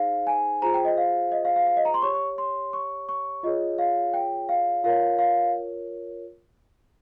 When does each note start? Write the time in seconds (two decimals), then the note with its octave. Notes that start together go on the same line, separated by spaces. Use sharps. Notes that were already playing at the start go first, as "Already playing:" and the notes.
Already playing: D#4 G#4 C5 F5
0.27 G#5
0.62 F4 G#4 C5 A#5
0.74 G5
0.85 D#5
0.98 F5
1.32 D#5
1.45 F5
1.56 F5
1.67 F5
1.77 D#5
1.85 A#5
1.94 C6
2.02 G4 C#5 C#6
2.14 C#6
2.38 C6
2.73 C#6
3.09 C#6
3.43 F4 G#4 C#5 D#5
3.78 F5
4.14 G5
4.49 F5
4.84 F4 A#4 C#5 F5
5.19 F5